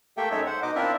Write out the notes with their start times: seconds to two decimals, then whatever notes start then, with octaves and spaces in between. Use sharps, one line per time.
0.17 A3 A#3 G4 A4 E5 G5
0.31 F#2 G#3 D#4 A4 C#5 E5
0.46 C5 F#5
0.63 B2 D#4 D#5 D6
0.75 C4 D4 E4 F4 A#4 E5